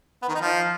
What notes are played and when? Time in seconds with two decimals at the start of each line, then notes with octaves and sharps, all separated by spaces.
0.22 B3
0.28 D#3
0.35 D#4
0.41 F3